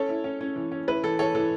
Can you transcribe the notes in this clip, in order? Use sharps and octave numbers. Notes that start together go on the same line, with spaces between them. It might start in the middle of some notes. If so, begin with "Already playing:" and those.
Already playing: C#4 A4 C#5
E4
C#4
C#4
E3
C#4
E4 B4
E3 A4
E3 A4 C#5
E3 A4